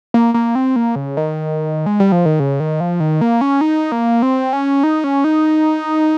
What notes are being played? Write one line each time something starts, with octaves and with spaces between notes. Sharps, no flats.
A#3
A#3
C4
A#3
C#3
D#3
G#3
G3
F3
D#3
C#3
D#3
F3
D#3
A#3
C#4
D#4
A#3
C4
C#4
D#4
C#4
D#4